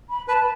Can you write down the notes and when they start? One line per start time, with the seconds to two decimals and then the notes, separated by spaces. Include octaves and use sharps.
0.09 B5
0.28 B4 A5